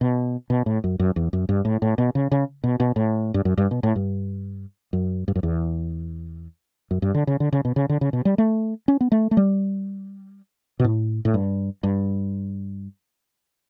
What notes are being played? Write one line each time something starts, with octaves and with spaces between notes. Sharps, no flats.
B2
B2
A2
F#2
F#2
E2
F#2
G2
A2
A2
B2
C#3
C#3
B2
B2
A2
G2
F#2
G2
B2
A2
G2
F#2
G2
F#2
E2
F#2
G2
D3
C#3
D3
C#3
B2
C#3
D3
C#3
B2
G3
A3
C#4
B3
A3
A3
G3
B2
A2
A2
G2
G2